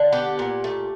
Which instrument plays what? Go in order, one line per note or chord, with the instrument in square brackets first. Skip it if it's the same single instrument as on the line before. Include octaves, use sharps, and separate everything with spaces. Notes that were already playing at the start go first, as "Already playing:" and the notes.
Already playing: [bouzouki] D3
B3 G4
A#2
A3